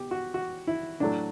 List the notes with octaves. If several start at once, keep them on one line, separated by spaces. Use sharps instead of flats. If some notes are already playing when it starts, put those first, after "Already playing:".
Already playing: B2 G4
F#4
F#4
E4
A2 F#3 A3 D4